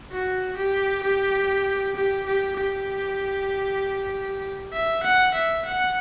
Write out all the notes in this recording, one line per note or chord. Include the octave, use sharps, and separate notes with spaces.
F#4
G4
G4
G4
G4
G4
E5
F#5
E5
F#5